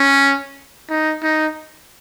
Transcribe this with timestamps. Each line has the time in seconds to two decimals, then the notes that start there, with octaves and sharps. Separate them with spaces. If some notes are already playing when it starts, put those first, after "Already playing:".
Already playing: C#4
0.89 D#4
1.23 D#4